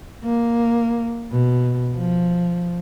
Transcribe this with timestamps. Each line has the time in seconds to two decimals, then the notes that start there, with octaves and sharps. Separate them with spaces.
0.23 A#3
1.31 B2
1.95 F3